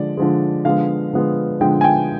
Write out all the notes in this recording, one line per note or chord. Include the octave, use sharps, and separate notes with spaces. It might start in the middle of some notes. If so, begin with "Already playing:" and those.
Already playing: D3 F3 G#3 D5
D3 F3 G#3
D3 F3 G#3 B3 F5
D3 F3 G#3 B3
D3 F3 G#3 B3 G5
G#5
G5